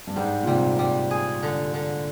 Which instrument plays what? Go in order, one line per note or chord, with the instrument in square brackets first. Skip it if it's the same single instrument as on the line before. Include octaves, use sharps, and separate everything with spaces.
[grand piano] G2
[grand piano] G#2 [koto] G3
[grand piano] A#2
[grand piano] C3 [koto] G3
[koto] G3
G#4
D3
D3